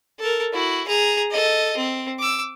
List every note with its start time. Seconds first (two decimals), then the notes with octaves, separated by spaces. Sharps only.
0.20 A4 A#4
0.53 E4 F#4
0.88 G#4 A#5
1.31 A4 D#5
1.77 C4
2.19 D6 E6